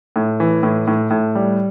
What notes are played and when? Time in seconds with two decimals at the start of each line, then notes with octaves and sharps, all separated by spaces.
0.16 A2
0.40 E3
0.63 A2
0.87 A2
1.11 A2
1.35 G3